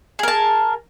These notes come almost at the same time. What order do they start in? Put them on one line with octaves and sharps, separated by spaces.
G#4 A#4 A5